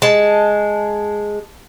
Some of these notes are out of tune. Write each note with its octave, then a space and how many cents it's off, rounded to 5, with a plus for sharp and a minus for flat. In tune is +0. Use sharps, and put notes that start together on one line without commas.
G#3 +0 A5 +0